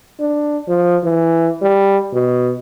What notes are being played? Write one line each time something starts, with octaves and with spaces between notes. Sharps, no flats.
D4
F3
E3
G3
B2